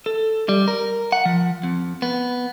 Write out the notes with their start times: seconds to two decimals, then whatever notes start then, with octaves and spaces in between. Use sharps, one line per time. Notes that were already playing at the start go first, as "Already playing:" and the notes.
0.06 A4
0.49 G3
0.68 A#4
1.12 F#5
1.25 F3
1.63 F2
2.02 B3